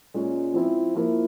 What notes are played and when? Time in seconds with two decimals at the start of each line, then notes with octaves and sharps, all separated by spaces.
0.14 A#2 G#3 C#4
0.54 F3 C4 E4
0.95 F3 A#3 E4